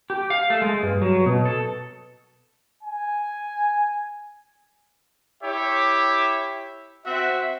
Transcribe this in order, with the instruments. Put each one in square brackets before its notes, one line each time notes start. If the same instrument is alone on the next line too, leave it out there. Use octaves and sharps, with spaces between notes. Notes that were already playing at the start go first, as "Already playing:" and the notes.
[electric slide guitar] G4
F5
A3
G#3
G2
F#3
B2
A4
[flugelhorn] G#5
[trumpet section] E4 G4 C#5 E5
C4 F#4 E5